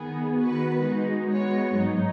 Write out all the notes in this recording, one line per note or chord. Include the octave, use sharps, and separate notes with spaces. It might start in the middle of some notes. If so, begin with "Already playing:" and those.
Already playing: D#3 B3 G#4
D#3 B3 F#4 B4
G#3 D#4 F#4
G#3 B3 F#4 C#5
G#2 F#3 D#4